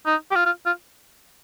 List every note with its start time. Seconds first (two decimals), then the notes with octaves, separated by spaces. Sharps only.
0.06 D#4
0.31 G4
0.36 F4
0.46 F4
0.66 F4